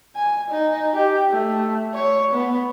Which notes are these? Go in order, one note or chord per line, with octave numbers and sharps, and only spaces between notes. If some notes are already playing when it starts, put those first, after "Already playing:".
G#5
D#4
G4
A3
C#5
B3